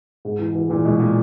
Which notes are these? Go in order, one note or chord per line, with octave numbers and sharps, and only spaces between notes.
G#2
E3
E3
A#2 E3
B2 G#3
A#2 G#3